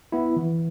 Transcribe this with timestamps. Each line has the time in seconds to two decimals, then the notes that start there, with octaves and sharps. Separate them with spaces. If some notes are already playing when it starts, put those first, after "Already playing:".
0.12 B3 E4
0.36 E3